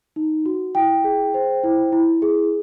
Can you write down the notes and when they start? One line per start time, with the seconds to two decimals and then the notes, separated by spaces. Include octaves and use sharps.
0.16 D#4
0.46 F#4
0.75 E4 G5
1.04 G#4
1.34 C5
1.64 E4
1.93 E4
2.22 G#4